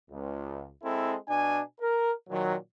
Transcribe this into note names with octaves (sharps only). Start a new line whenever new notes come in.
C#2
G#3 C4 E4 A4
B2 D4 G#5
A#4
A#2 D#3 F#3